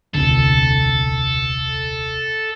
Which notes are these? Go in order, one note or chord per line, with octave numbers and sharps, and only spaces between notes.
D#1 C2 D3 A4